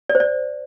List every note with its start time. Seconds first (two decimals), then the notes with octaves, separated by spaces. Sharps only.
0.09 D5
0.15 C5
0.20 D5